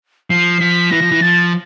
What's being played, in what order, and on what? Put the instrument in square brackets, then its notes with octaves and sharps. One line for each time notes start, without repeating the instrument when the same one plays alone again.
[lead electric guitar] F3 [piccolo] C7
[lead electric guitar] F3 [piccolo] B6
[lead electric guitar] E3 [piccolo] A#6
[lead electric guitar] F3
E3
[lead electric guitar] F3 [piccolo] A6